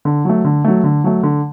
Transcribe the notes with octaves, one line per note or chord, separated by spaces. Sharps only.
D3
F#3 A3
D3
F#3 A3
D3
F#3 A3
D3